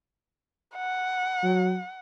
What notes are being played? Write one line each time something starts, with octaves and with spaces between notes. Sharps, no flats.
F#5
F#3